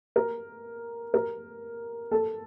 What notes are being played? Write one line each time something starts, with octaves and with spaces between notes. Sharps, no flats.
A#4
A#4
A4